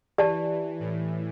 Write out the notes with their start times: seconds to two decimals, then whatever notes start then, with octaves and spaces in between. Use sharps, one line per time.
0.18 E3 G4 D5 A5
0.80 A2